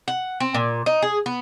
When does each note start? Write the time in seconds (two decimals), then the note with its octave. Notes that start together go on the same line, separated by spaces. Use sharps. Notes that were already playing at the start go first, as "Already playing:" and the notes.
0.08 F#5
0.40 C4
0.54 A#2
0.86 D#4
1.02 G#4
1.26 B3